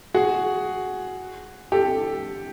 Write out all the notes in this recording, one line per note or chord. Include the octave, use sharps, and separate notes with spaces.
F#4 G#4
G4 A4